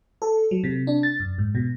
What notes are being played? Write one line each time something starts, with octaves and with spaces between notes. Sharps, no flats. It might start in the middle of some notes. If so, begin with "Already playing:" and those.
A4
F#3
C3
D4
A6
F#2
G#2
B2